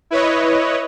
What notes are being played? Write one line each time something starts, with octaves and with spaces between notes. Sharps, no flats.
E4 B4 C#5 D#5